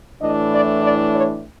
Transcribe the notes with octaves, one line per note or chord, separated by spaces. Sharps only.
A2 E3 A3 D4 D#5
D5
D5
C#5